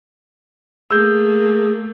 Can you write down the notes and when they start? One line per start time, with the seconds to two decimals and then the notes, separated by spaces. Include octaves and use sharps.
0.91 A3 A#3 G#4 E6 G6